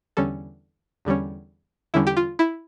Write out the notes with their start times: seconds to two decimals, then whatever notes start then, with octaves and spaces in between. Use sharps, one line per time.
0.17 E2 D3 G3 C#4 A4
1.05 E2 D3 G3 C#4
1.94 E2 D3 G3 C#4 E4
2.07 G4
2.17 F4
2.39 E4